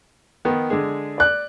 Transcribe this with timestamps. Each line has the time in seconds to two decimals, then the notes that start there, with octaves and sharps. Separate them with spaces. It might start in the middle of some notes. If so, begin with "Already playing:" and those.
0.45 D#3 B3
0.70 D3 G#3 G#4
1.18 D5 F#6